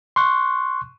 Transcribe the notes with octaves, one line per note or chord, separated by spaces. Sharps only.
C6 C#6 F#6